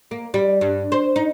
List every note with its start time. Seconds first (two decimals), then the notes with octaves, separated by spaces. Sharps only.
0.11 A#3
0.34 G3
0.61 G2
0.92 C5
1.16 D#4